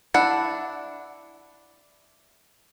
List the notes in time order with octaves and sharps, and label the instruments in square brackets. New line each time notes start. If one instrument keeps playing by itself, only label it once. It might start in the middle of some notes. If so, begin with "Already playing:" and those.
[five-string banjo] D4 E4 F#5